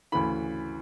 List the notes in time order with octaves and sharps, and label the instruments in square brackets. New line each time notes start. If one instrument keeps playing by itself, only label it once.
[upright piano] D2 C#3 E3 B5